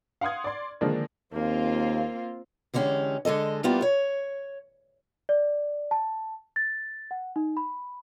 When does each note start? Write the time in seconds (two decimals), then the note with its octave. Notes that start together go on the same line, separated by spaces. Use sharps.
0.21 F5 F#5 C6 D#6 G#6
0.44 D5 C6
0.81 D3 D#3 F3 G#3 A#3 D4
1.33 D#2 A#3 C4 F4
2.74 D3 E3 G#3 C#4 G4
3.25 D3 G#3 A4 D#5
3.63 G3 A#3 B3 E4 F4 G4
3.82 C#5
5.29 D5
5.91 A5
6.56 A6
7.11 F#5
7.36 D#4
7.57 B5